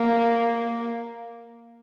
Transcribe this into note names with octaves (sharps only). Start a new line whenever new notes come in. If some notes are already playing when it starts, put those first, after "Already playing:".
Already playing: A#3